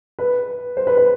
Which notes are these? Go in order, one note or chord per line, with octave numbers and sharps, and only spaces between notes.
B4
C5
B4
B4